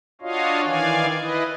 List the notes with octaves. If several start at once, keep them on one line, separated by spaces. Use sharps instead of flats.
D4 F4 F#4 C#5 D#5 F5
D#3 E3 D5 F5 G#5
E4 B4 D#5